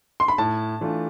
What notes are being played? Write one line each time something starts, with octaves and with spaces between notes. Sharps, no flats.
C6
B5
A2 A5
E3 A3 D4 F4